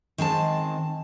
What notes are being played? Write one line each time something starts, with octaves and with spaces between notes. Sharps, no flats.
D#3 G#3 C4 A5